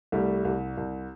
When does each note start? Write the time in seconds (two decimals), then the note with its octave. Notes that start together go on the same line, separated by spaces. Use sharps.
0.12 C2 G3 A3
0.45 C2
0.77 C2